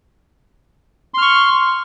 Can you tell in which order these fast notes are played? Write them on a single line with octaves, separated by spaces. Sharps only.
C6 F6 C#6